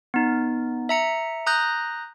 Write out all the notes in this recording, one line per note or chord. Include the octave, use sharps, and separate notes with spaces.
B3 D#4
E5 A#5 C#7
A#5 D#6 F#6 G6 A#6